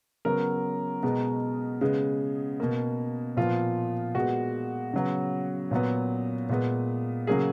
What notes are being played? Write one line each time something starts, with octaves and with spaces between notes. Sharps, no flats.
C#3 F#3 B3 A#4
B2 G#3 B3
C#3 G#3 B3
B2 A#3
A#2 F3 B3 F4
A#2 G#3 B3 F#4
C#3 F#3 B3
A#2 F#3 B3
A#2 G#3 B3
C#3 F#3 A#3 G#4